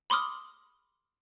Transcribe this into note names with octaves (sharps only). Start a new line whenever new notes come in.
B5 C6 D6 D#6 F6